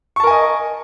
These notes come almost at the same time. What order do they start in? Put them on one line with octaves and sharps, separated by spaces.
C#6 A5 A#4 G#5 D#5